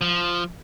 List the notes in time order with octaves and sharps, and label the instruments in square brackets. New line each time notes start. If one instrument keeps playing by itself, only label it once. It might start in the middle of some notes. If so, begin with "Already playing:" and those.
[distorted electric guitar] F3